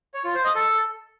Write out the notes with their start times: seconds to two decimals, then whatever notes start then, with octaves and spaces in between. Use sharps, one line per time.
0.14 C#5
0.24 F4
0.34 C5
0.45 D#5
0.55 A4